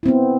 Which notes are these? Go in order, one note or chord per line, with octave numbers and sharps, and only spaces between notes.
B3 C4 E4